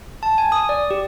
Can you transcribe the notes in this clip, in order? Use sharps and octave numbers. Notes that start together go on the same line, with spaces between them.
A5
G#5
D#6
D5
G4